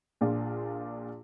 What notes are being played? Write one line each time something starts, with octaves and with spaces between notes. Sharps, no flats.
A#1 A#2 D4 F4